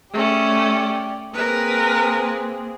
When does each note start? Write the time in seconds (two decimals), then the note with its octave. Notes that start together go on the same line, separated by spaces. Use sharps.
0.13 A3 C#4 G4 D5
1.33 A#3 C4 G#4 A#4 B4